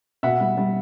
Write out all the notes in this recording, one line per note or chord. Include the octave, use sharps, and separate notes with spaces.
B2 E5 F#5
G3
G3